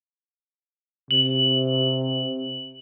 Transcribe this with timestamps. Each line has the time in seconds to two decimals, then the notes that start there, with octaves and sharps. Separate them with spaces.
1.11 C3 F#7